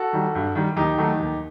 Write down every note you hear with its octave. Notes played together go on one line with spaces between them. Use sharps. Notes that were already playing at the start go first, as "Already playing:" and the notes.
Already playing: F#4 A4
D#3 G3
G2
D#3 G3
D#2 D#4 G4
D#3 F#3 A3
D#2